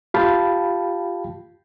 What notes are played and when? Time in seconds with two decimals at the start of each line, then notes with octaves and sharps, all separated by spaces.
0.14 F4 G4 F5 G5 A5 B5